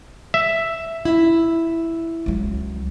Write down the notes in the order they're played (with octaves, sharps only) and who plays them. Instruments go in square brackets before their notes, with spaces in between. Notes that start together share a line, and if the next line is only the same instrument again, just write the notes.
[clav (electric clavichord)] E5
[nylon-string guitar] E4
[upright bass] C#2 F#3